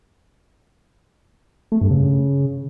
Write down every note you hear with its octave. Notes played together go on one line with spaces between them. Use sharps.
A3
G2
C#3